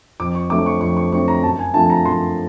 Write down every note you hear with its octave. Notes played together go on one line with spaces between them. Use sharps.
F2 D6
C#6
D3 F#3 A3 C4 D6
C#6
F2 C#6
C#6
D3 F#3 A3 C4 C#6
A#5
F#2 A5
G#5
D3 F3 A3 C4 A5
A5
A#5
F#2 C6